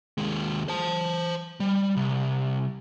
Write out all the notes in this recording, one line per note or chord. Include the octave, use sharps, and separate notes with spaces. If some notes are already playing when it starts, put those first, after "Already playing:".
D#2 G#3
C5 A5
G3
C2